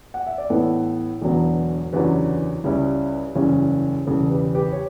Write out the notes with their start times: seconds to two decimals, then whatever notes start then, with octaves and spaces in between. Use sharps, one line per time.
0.14 F#5
0.27 E5
0.38 D5
0.50 A2 E3 B3 A4 C#5
1.21 E1 E2 D3 F#3 B3
1.93 F#1 E2 D3 F#3 C#4 G4 B4
2.64 C#2 C#3 G3 C#4 E4
3.35 F#1 E2 C#3 G3 C#4
4.07 E1 E2 C#3 G3 A4
4.31 G4 B4
4.54 G4 B4
4.72 C#5